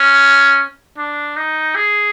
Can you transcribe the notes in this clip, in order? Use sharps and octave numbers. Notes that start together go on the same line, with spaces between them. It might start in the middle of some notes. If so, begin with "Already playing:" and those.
Already playing: C#4
D4
D#4
G#4